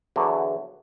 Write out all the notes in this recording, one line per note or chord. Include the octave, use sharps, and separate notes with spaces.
E2 D3 F#3